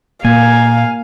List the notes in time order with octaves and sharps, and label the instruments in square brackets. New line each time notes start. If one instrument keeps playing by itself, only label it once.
[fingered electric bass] A#2 [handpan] A#3 [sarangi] F5 [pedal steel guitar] G#5